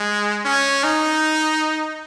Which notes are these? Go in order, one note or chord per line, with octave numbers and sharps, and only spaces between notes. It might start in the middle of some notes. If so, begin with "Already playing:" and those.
Already playing: G#3
C#4
D#4